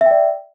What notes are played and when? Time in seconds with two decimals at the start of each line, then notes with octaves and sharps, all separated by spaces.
0.01 E5
0.06 G5
0.11 D5